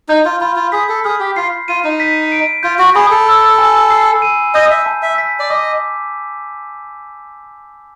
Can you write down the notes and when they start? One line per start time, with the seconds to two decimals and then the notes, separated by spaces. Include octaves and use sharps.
0.09 D#4 G6
0.25 F4
0.41 F4 B5
0.56 F4
0.72 G#4 B6
0.89 A4
1.05 G#4 F6
1.20 G4
1.36 F4 C7
1.68 F4 D#7
1.84 D#4
2.00 B6
2.32 D7
2.63 F4 G6
2.79 F#4
2.95 G#4 B5
3.11 A4
3.27 E6
3.59 G#5
3.90 C7
4.22 D#7
4.54 D#5 G6
4.71 E5
4.86 A5
5.03 E5
5.18 B6
5.39 D5
5.50 D#5 D6